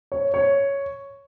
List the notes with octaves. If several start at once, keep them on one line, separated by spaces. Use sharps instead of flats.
C#5
C#5